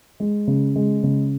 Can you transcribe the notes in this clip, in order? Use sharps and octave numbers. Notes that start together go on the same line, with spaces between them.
G#3
C#3
G#3
C#3